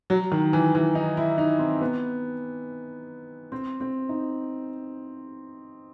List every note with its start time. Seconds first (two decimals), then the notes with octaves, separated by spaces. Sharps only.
0.10 F#3
0.32 D#3
0.53 E3
0.75 E3
0.95 D#4
1.17 E4
1.38 D#4
1.59 C4
1.81 B3
3.52 C4
3.80 C4
4.09 D#4